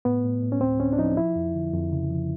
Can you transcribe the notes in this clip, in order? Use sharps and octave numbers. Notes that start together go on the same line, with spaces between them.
A2 B3
A2
A2
C#4
D2 C4
D2 C#4
D4
F3 D#4
F3 E4
F2
D3
F2
C#3
F3